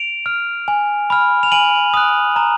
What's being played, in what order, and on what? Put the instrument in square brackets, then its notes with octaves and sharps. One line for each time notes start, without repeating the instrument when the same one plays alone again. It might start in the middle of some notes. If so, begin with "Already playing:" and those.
Already playing: [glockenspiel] D7 F7
F6
G#5
B5 F6
F7
G#5 D#7 F#7
D#6 F#6
A#5